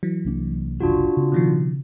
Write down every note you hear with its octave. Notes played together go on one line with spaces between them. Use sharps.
E3 F#3
C2 A#3 D4
F#1 C2 D4 F4 F#4
C#3 C4
B2 D#3 F3